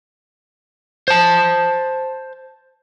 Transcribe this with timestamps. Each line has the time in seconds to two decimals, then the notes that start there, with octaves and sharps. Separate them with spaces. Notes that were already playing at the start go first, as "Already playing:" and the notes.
1.08 C5 A5